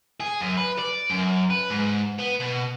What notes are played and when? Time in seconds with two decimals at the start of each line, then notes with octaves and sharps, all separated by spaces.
0.20 G#4
0.41 F#2
0.57 B4
0.78 D5
1.10 F#2
1.51 B4
1.70 G#2
2.19 B3
2.40 B2